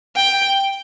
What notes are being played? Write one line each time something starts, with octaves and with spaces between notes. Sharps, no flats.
G5